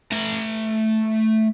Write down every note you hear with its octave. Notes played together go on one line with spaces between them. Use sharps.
A3 A#5